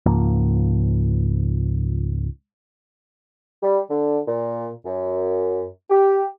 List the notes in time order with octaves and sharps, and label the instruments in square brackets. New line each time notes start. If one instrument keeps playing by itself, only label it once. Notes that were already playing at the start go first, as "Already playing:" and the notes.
[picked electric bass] C#2 G#2 F3 A#3
[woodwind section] G3
D3
A#2
F#2
G4